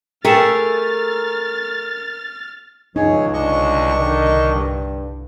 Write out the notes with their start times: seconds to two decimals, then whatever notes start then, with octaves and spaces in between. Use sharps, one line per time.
0.25 A3 G#4 A#4 G5 F6 A6 C#7 E7
2.96 C#2 F#2 F3 D#4 G#4 C#5
3.34 C2 D3 D4 D#5 C#6
4.00 D#3
4.55 G2